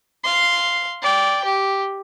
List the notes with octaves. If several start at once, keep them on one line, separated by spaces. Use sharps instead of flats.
F5 C6
D5 G5
G4